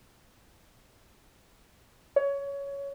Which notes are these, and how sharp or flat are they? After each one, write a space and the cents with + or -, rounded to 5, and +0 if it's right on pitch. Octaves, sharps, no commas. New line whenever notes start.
C#5 +10